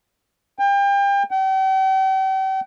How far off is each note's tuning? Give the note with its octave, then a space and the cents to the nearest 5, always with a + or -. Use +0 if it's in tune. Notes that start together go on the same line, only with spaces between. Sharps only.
G5 +35
G5 -40